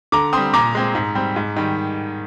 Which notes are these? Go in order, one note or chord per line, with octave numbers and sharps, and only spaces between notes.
D3 A#5 D6
G3 C4 C6 D#6
A#2 A#5 D6
G#3 C4
G#2
G3 C4
G#2
D#3 G3